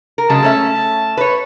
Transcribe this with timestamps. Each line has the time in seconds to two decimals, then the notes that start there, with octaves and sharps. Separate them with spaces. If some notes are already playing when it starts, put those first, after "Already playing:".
0.18 A#4
0.30 C#3 F#3 G#3 A5
0.43 A3 C#4 E5
1.17 B4 C#5